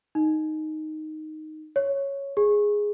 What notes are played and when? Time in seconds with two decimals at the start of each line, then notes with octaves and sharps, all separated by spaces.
0.15 D#4
1.76 C#5
2.37 G#4